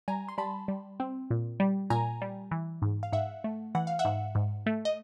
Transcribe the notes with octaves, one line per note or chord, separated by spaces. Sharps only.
G3 G#5 A#5
C6
G3 A5 B5
G3
C4
A#2
G3
A#2 G#5 A#5
G3
E3
G#2
F5
G#2 E5 F#5
A3
E3 F#5
F5
E5 F#5
G#2
G#2
A3
D#5